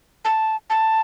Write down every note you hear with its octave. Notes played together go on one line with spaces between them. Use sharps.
A5
A5